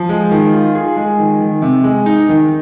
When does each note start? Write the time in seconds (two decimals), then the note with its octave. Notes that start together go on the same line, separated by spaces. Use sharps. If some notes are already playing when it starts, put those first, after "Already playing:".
Already playing: F3
0.09 G#3
0.31 D#3
0.53 F4
0.75 G#4
0.96 G#3
1.19 D#3
1.40 D#3
1.62 C3
1.84 G#3
2.06 D#4
2.29 D#3